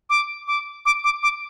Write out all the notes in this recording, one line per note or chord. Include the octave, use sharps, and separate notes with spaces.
D6
D6
D6
D6
D6